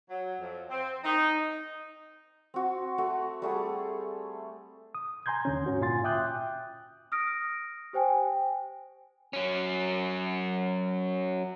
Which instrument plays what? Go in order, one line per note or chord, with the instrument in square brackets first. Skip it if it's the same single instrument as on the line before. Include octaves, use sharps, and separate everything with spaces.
[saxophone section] F#3
F2
C4
D#4
[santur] C4 F#4
A3 F#4
G3 A3 G#4
[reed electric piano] D#6
G#5 A#5 C6 G6 G#6
D#2 D3 C#4
G#2 C#4 F#4
A#2 F4 G#5 C6 A6
E5 G5 D6 D#6 F#6 G6
[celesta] D#6 F6 A#6 D7
G4 C5 G5 G#5
[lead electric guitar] F#3 C#4